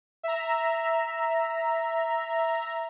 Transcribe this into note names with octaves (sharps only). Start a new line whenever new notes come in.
E5 A#5